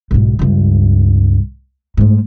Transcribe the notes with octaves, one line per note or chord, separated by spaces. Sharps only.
B1 G#2
C#2 G2
G#2 A3